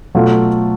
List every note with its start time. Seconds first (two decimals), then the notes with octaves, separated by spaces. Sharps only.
0.15 B2 F#3 A3 F4